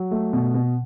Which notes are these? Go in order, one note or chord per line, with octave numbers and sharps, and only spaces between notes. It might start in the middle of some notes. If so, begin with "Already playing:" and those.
Already playing: F#3
A3
B2
B2